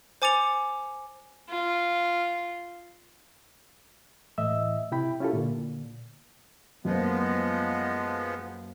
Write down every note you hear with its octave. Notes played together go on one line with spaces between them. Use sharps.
C5 G#5 D6 A6 C#7 F7
F4
A2 E3 D#5 E5 E6
C3 E4 G5 B5
C#4 E4 F4 G4 A4
A#2 D3
F#2 F3 G#3 A#3 B3 C5